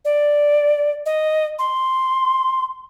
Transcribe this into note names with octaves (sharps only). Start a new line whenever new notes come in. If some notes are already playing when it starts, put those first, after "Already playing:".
D5
D#5
C6